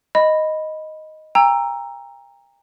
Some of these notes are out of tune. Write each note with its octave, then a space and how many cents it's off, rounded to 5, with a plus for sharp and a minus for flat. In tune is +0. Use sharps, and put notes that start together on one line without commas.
D#5 +0 B5 +0
G5 +40 A#5 +0 E6 +10